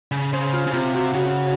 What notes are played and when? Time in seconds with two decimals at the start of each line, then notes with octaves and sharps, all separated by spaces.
0.11 C#3
0.33 C#3 C5
0.53 F4
0.67 C#3
0.73 C3 F4
0.94 F#4
1.14 C#3 F#4